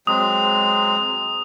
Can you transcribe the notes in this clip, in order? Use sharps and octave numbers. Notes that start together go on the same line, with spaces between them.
F#3 G#3 C4 D#6